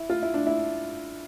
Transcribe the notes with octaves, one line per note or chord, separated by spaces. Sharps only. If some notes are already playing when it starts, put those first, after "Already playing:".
Already playing: E4
F4
E4
D4
E4